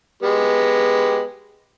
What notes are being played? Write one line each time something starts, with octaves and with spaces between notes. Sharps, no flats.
G#3 B3 G4